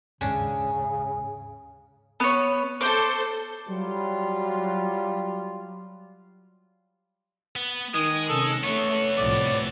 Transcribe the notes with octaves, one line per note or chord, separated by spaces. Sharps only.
D#2 G#2 C#3 C#4 D4 G#5
B3 C#5
A4 C5 D6 G6
F#3 G3 F4
B3
D#3 G#3 D#6
C3 C#4 A4
E3 A3 B3 C#5 C#6
C2 A2 F3 D5